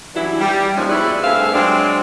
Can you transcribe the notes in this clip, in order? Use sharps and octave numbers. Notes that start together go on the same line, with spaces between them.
E3 F#3 G3 C#4 D4 E4
G3
D#2 D#3 F3 G#3 C#4 D5
F3 B3 E4 F#4 G#4 D5
G2 A3 C4 G#4 E5 F5
F#3 G#3 C4 D4